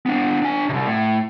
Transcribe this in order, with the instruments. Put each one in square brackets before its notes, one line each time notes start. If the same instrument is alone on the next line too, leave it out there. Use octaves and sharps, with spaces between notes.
[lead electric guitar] B3 D4
D4 G#5
C2 C3
A2